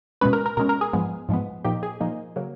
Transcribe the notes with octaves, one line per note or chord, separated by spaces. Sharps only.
B2 G#3 C#4 B4
A#4
A#4
B2 G#3 C#4 A#4
A#4
G#4
G#2 F3 G#3 B3
G#2 F3 G#3 B3
A#2 F3 A#3 D#4 G4
G#4
A#2 F3 A#3 D#4
C#3 F#3 A#3